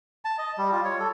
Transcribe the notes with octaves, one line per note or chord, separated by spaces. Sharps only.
A5
D#5
G3
F4
C#5
A4